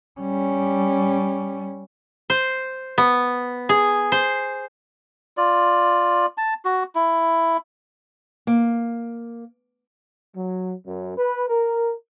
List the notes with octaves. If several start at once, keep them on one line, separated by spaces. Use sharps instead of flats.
G3 C#4
C5
B3
G#4
C5
F4 D5
A5
F#4
E4
A#3
F#3
F#2
B4
A#4